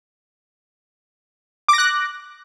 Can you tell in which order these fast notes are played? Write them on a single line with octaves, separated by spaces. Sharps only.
D6 A#6 F#6